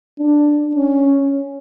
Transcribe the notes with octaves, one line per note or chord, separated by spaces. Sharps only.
D4
C#4